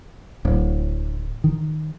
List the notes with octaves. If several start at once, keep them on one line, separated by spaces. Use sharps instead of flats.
D1
D#3